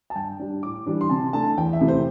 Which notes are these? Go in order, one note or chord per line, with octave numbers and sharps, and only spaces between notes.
A5
G2 G5
G3 D4
A2 D6
E3 G3 D4
C6
C3 A5
A3 D4 A5
E2 G5
E5
C3 E3 A3
C5